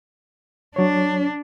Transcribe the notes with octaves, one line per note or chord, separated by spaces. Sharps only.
F#3 D4 C#5